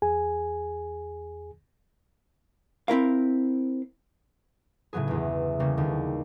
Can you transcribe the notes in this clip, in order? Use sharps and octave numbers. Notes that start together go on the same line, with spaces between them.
E2 G#4 G#5
C4 E4 A#4 F5
A2 C#3 F#3 B3 G#4
G1 E2
C#3 G3 A#3 C#4
D#2 D3